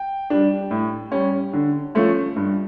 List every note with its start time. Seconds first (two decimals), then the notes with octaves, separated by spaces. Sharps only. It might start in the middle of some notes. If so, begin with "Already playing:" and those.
Already playing: G5
0.30 G3 D4
0.71 A2
1.12 G3 C#4
1.53 D3
1.95 F3 A3 C#4
2.36 G2